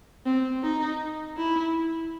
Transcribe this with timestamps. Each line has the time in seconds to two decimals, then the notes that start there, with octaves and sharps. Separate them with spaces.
0.26 C4
0.63 D#4
1.37 E4